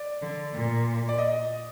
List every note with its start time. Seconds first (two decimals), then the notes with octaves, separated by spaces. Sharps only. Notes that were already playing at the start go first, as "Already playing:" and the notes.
Already playing: D5
0.22 D3
0.54 A#2
1.09 D5
1.18 D#5